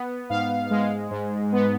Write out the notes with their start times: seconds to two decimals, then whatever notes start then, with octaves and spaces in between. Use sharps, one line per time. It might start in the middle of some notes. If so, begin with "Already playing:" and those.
Already playing: B3
0.30 G#2 F5
0.71 G#3
1.11 G#2
1.52 B3